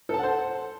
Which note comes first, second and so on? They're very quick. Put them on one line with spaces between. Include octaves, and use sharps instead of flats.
A4 A5 F#5 C5